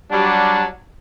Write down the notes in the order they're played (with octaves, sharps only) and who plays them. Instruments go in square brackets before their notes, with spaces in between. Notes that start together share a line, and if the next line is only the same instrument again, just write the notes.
[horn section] F#3 G3 D4